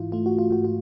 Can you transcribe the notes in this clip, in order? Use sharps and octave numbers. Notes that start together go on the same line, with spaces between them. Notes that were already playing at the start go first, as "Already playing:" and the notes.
Already playing: G#2 E3 E4 F4
A3 F4
F#4
F4
G#2 F#4
F4